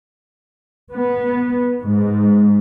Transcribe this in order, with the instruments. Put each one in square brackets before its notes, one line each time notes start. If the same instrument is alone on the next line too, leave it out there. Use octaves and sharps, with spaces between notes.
[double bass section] B3
G#2